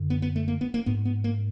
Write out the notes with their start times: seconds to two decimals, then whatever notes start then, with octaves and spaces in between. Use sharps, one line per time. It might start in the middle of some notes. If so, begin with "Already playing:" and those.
Already playing: F#2 D3
0.10 B3
0.22 B3
0.36 A3
0.48 A#3
0.61 B3
0.74 A#3
0.86 G#2 B3
1.05 B3
1.24 A#3